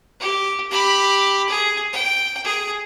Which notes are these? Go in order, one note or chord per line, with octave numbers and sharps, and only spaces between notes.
G4
G4 B5
G#4
G5
G#4